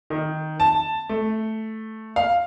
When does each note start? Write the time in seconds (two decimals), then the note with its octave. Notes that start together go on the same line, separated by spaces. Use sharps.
0.10 D#3
0.60 A5
1.09 A3
2.16 F5